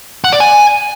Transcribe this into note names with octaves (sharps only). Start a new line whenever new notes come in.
F#5
D5
G#5